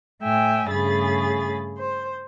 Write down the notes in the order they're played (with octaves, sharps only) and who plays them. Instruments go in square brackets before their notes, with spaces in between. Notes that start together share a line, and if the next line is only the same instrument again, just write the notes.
[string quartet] A2 E5 G5 G#5
G2 C#3 A3 G#4 B5 A6
C5